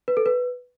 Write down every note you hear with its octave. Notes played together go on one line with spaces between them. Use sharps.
B4
A4
B4